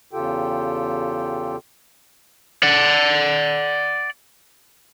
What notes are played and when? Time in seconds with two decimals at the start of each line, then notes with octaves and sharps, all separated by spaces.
0.13 E2 C#3 F4 G4 A4 G5
2.63 D5 F#5